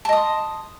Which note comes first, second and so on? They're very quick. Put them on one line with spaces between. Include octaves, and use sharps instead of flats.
A5 D#5 D#6 C6